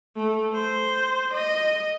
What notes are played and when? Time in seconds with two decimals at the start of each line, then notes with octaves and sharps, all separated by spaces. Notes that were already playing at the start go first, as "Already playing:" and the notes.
0.16 A3
0.54 C5
1.34 D#5